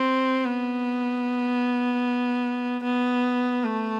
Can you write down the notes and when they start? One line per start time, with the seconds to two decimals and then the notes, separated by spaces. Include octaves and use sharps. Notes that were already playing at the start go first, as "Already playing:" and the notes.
Already playing: C4
0.46 B3
2.84 B3
3.64 A3